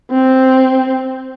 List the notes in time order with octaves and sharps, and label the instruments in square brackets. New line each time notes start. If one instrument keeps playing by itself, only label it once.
[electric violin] C4